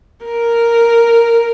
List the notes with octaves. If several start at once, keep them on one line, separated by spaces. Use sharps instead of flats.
A#4